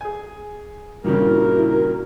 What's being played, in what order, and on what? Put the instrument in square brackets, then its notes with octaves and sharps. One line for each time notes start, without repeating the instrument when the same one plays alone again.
[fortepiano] G#4 G#5
[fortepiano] G2 A#2 C#3 [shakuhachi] E4 [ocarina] F#4 [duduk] A#4